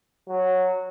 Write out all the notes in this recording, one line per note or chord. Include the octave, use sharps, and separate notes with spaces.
F#3